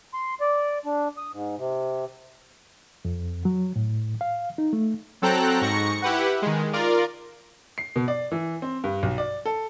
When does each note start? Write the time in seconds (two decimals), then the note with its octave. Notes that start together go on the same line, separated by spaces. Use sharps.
0.14 C6
0.41 D5
0.85 D4
1.17 D#6
1.33 G#2
1.58 C3
3.05 F2
3.45 F#3
3.76 A2
4.21 F5
4.58 D#4
4.73 A3
5.22 F#3 C4 A4 G5 A#5 F#6
5.61 G#2 C#6 A#6 C#7
6.02 E4 G4 B4 F#5
6.42 D#3 G#3
6.73 F4 A#4 D5
7.78 C7
7.96 B2
8.08 D5
8.32 E3
8.62 C4
8.84 G2
9.03 B1
9.18 D5
9.46 A4